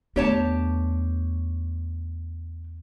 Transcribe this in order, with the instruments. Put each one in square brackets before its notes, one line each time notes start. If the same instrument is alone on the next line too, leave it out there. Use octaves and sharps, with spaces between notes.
[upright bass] E2 A3 [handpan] B3 D4 [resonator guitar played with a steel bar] G4 C#5 A5